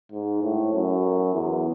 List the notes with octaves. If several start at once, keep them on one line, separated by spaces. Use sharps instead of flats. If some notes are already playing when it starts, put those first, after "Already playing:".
G#2
A2
F#2
E2